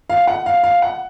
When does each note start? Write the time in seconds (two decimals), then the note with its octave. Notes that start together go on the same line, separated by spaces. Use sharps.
0.10 F5
0.27 F#5
0.46 F5
0.64 F5
0.82 F#5